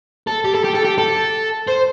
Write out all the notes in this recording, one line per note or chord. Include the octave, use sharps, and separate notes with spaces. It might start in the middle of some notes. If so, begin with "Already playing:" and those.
A4
G4
A4
G4
A4
G4
A4
C5